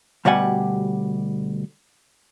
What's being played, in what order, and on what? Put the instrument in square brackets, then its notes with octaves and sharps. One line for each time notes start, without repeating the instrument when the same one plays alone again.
[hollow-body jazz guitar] D2 B2 G3 G4 F#5 G#5